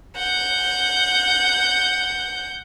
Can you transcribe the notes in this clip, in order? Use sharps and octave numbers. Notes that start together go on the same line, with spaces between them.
F#5 G6